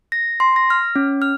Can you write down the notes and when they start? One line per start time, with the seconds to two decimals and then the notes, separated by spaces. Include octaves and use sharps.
0.12 A#6
0.40 C6
0.56 A#6
0.70 F6
0.96 C#4
1.22 F6